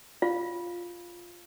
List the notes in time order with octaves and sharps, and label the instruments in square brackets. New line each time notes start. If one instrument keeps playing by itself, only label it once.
[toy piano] F4 F5